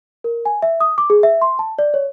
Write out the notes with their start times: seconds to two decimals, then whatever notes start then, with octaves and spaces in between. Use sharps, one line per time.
0.24 A#4
0.45 G#5
0.62 E5
0.81 D#6
0.98 D6
1.10 G#4
1.23 E5
1.42 C6
1.59 A5
1.79 D5
1.94 C#5